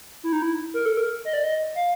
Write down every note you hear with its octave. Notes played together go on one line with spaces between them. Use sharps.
E4
D#4
E4
A#4
A4
A#4
D#5
D5
D#5
F5